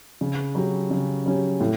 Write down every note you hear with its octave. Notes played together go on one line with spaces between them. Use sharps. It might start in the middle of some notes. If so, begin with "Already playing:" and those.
C#3
F#3 C#4 G4
C#3
F#3 C#4 G4
A2